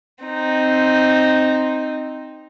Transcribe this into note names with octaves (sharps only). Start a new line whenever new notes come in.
C4 D#4